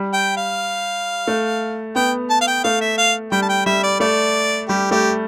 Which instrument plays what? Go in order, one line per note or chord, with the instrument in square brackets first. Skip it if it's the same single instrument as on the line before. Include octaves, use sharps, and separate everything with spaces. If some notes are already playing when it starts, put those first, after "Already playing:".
Already playing: [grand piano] G3
[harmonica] G5
F5
[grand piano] A3
[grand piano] B3 [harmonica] G5
[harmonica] A5
F5
G5
[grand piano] A3 [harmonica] F5
[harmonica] E5
F5
[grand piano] G3 [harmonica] G5
[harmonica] A5
G5
[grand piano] G3 [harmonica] E5
[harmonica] D5
[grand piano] A3 [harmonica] D5
[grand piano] G3 [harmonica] G4
[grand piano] A3 [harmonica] G4